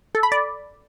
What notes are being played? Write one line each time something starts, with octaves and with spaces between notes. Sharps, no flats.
A4
B5
D5